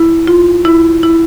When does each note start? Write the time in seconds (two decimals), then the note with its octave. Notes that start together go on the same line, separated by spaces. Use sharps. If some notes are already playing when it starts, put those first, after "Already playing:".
Already playing: E4
0.27 F4
0.65 E4
1.03 E4